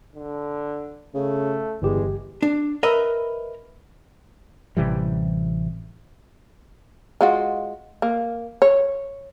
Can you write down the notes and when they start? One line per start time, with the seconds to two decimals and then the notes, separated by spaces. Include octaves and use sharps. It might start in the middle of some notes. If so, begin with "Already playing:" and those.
0.15 D3
1.14 C#3 A3
1.82 G1 E2 G#3 G4
2.43 D4
2.83 A#4 B4 D#5 E5
4.77 A1 C3 E3 G3
7.21 G#3 F4 F#4
8.02 A#3
8.62 C#5